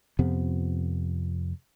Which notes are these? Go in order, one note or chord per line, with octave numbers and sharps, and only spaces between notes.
F2 C3 F3 B3